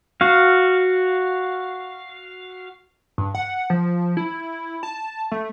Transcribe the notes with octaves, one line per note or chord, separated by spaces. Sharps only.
F#4 F5
G2
F#5
F3
E4
A5
A3